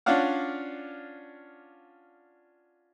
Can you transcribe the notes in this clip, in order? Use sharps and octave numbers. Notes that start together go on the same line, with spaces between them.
C#4 D4 F4 D5 F5 F#5